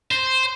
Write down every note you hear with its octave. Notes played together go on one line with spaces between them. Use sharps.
C5